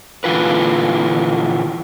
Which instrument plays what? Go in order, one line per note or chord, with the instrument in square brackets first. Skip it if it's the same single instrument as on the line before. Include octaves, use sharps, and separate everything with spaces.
[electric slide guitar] A#2 D3 E3 F4 B4